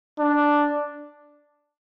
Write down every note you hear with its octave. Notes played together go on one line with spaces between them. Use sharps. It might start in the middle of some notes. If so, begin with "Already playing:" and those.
D4